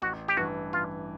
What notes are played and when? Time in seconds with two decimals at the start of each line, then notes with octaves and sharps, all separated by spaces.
0.02 A1 F#4
0.28 G4
0.37 G2 E3 F#4
0.73 A1 F4